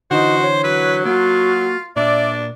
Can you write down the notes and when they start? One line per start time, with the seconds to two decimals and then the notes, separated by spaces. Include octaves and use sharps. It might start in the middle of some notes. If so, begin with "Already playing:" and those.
0.11 D3 E3 D#4 F#4 C5
0.42 C#5
0.64 F#3 B4
1.05 A#3 F4 F#4
1.96 A#2 D4 D5 E5